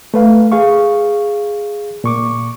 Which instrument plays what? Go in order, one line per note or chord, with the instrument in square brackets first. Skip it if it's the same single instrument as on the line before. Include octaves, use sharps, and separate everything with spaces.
[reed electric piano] A3 B4 F5
G#4 F5 C#6
A#2 C#6 D6